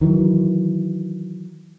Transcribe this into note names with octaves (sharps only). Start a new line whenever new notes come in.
D#3 E3 F#3